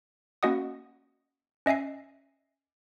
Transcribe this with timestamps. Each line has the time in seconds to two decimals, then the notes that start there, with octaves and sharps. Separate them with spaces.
0.43 A#3 C#4 F#4 D#5 F#5 D#6
1.66 C#4 D#5 E5 G#5 C7